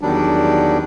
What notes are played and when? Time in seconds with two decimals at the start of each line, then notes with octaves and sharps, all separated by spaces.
0.01 E2 D#3 F#3 G3 D4